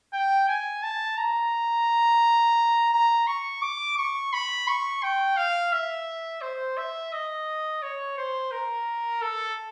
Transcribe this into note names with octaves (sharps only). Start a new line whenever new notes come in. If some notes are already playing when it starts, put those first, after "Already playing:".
G5
G#5
A5
A#5
A#5
C#6
D6
C#6
B5
C#6
G5
F5
E5
C5
E5
D#5
C#5
C5
A#4
A4